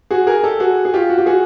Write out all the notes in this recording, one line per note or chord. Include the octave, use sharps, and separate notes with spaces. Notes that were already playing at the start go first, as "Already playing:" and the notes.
F#4 G#4
G#4 A#4
G4 A4
F#4 G#4
G#4
F4 G4
F#4
G4
F#4 G#4